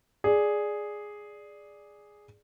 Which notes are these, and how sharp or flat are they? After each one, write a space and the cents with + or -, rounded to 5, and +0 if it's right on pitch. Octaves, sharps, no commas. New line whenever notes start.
G#4 +0 D5 +0